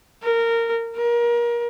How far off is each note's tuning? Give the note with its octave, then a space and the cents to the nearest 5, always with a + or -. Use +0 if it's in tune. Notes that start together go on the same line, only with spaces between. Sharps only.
A#4 -15
A#4 +30